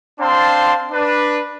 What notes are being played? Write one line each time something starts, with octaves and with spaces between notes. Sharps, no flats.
C4 D4 F5 A5 C6
D4 B4